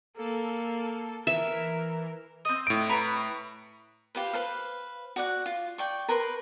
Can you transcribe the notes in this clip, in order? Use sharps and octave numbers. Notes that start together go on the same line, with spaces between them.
A#3 A4
E3 A#4 E5
C4 D#5
A2 D7
B4 A#5 C#6
F4 G4 B4 C5
B4 C5 F5
F#4 D5 F#5
F4
D5 G5 C#6
A#4 B4 C6